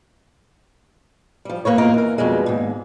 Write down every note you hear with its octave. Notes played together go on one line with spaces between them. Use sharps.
F3 G3
E2 A2 A#3 B4 C#5
E2 A2 A#3 F4 A#4 D#5
E3 A#4
F2 B2 G3 G#3
D#2 G#2